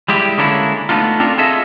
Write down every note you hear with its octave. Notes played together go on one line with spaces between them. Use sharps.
G3 G#3 E4 G4
D3 G#3 A#3 C#4 D4 E4
A3 B3 D4 D#4 F4
C4 D4 F4 A4 A#4
F4 G#4 A4 D#5 E5